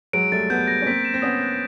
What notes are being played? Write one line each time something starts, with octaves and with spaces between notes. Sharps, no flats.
F#3 G#3 D7
G3 A3 A6
A3 B3 G6
A#6
C#4
A#3 C4 B6
E7
C4
B3 C#4 D#6
F#6